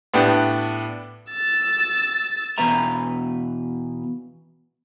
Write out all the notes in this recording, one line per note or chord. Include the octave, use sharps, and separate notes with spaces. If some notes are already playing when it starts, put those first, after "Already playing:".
A2 B3 D4 G4
E6 A6
E2 B2 B4 E5 A#5